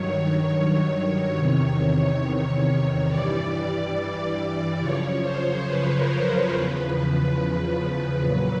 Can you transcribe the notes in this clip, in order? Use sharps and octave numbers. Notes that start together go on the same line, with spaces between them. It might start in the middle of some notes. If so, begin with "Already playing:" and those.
Already playing: G2 D#3 F#3 C#5
E2 C3 D#3 C#5
G2 E3 G3 D5
F#2 C#3 F3 C#5
C5
B4
A#4
B4
E2 C#3 F3 B4
A#2 F#3 B4